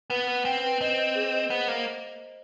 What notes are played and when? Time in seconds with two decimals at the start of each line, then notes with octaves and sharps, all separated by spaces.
0.10 B3 B4
0.28 B4
0.45 C4 G5
0.63 B4
0.81 C4 D#5
0.98 D#5
1.15 G#4
1.33 D#5
1.50 B3 C5
1.68 A#3 C5